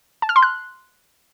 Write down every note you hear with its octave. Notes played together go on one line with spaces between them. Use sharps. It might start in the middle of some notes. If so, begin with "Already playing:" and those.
A5
F6
C6
F#6